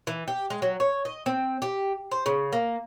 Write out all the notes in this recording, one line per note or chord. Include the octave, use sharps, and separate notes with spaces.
E3
G4
G#3
F#3
C#5
D#5
C4
G4
C5
C#3
A#3